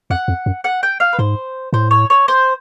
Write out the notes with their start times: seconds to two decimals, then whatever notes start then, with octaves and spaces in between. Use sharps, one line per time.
0.10 F2 F#5
0.28 F2
0.46 F#2
0.64 F#5
0.83 G5
1.00 F5
1.13 B4
1.19 G#2 C5
1.73 A2 C5
1.91 C#5
2.10 C#5
2.28 C5